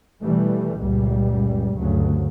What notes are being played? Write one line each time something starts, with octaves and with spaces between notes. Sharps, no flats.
B2 E3 G3 A3
C#2 F#2 A#2 G3
D2 G2 C#3 F#3